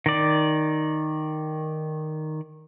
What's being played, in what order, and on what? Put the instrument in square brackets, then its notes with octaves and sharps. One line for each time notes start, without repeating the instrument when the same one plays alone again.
[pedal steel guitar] D#3 D5